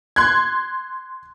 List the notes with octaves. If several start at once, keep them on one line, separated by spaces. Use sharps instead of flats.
C6 F#6 G#6